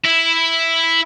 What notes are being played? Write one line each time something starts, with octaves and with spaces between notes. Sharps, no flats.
E4